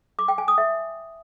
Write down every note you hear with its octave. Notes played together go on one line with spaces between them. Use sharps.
D6
G5
G#5
D#6
E5